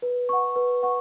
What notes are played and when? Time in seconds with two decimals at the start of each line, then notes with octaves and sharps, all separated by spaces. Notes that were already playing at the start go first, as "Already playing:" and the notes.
0.02 B4
0.29 F#5 C#6
0.56 B4
0.83 F#5 C#6